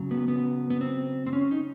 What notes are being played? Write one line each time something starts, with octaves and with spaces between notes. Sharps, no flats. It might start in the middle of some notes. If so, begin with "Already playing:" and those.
Already playing: C#3 F#3
B3
B3
B3
C4
C4
C#4
D#4